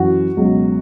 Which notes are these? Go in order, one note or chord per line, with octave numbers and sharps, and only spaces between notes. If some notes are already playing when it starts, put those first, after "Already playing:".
Already playing: F#2 E3 F#4
C#2 B2 F#3